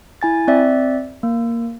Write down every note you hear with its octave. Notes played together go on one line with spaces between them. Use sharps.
E4 G#5 A6
C4 D5 E5
A#3